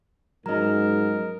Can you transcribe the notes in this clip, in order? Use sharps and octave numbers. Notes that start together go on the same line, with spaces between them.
G#2 F#3 C#4 A#4 D#5 A#5